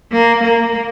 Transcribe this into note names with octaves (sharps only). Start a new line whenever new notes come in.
A#3
A#3